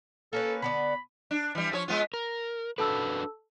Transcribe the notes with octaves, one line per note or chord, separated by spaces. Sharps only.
A#3 C#4 A4 B4
D3 B3 D5 B5
D4
E3 G3
F3 G#4 C#5
G#3 B3 F4
A#4
D4 F#4 A4 B4 A5 E6